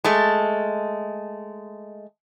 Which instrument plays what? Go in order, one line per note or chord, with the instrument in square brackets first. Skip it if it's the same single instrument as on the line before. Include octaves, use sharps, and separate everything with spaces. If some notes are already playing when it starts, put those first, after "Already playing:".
[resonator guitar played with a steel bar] G#3 A3